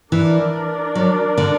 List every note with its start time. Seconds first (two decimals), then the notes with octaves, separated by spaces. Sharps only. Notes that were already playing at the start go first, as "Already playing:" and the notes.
0.12 E3 D4 A#4 D5
0.95 F#3
1.38 D3